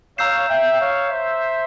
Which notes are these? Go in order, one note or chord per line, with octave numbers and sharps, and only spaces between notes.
C#5 F5 A#5 E6 G6 C7 E7
E5 G5
C#5 F5
C5 E5